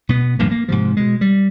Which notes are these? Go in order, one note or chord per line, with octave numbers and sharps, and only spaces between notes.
B2 B3
D1 G2 F3 A#3
A#3
G#2 C3 F3
B2 G#3
G3